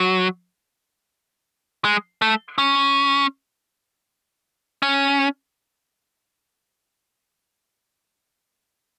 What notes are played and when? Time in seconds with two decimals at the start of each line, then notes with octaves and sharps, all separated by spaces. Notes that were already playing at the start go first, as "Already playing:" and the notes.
Already playing: F#3
1.85 G#3
2.22 A3
2.58 C#4
4.82 C#4